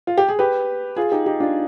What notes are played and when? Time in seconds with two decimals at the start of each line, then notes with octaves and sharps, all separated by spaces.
0.07 F4
0.18 G4
0.29 G#4
0.39 G4 B4
0.96 F4 G#4
1.12 D#4 G4
1.26 D#4 G4
1.40 D4 F4